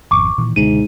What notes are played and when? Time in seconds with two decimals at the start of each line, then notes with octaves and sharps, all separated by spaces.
0.11 G#1 F2 B2 C#6 D6
0.38 A#2 D#3 E3
0.56 C#2 G#2 B2 D3 D#7